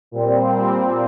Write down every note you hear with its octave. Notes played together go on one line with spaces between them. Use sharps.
A#2 G3 C4